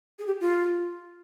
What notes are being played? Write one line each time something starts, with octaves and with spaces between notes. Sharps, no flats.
G#4
G4
F4